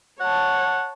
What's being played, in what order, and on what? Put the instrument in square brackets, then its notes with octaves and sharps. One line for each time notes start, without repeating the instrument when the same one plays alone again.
[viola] C#5 A5 [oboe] F#5